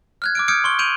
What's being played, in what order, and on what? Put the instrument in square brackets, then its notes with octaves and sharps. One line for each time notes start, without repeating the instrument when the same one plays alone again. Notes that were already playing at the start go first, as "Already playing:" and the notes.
[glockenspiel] F6 F#6 G#6
D6 F6 D7
D#6 F6 G6 G#6 C#7 D7
C6 C#6 G7
G6 D7 D#7 F7 F#7